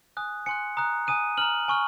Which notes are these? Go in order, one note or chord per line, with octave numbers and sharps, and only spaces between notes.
G#5 D#6 F#6
G#5 C6 F#6 C#7
A#5 D#6 F#6
G#5 D#6 F#6 D#7
A#5 F6 F#7
G#5 C#6 F6